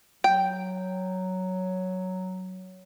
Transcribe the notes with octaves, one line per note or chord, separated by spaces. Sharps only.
F#3 G5